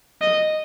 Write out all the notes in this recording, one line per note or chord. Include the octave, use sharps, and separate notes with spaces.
D#5